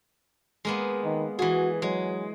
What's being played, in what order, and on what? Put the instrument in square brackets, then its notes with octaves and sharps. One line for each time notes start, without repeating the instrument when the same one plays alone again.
[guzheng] G#3 A#3 B3
[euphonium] D#3
[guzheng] E3 G#4 [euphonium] F#4
[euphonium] F#3 [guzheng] G#3